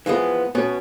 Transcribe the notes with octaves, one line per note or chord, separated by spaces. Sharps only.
E3 F3 G#3 B3
B2 B3 C#4